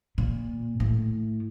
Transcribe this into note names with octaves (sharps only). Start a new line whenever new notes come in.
A#2
A2